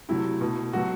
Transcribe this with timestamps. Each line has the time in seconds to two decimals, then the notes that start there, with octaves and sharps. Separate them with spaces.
0.09 C3 F#3 A3 E4
0.41 B2 A3
0.73 B2 F#3 A3 F#4